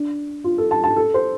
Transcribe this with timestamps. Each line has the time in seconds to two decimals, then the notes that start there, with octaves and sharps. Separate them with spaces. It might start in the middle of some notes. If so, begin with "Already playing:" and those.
Already playing: D4
0.44 F4
0.58 A4
0.71 A5
0.84 A5
0.96 A4
1.14 C5